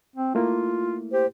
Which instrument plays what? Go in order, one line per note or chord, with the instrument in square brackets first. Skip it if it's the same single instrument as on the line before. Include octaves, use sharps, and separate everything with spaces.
[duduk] C4
[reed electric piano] A3 A#3 E4 [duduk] F4
[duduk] G4 [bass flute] C5